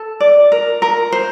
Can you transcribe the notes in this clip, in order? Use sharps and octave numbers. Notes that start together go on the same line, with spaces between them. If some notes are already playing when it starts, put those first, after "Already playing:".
Already playing: A4
D5
A#4
A#4
C5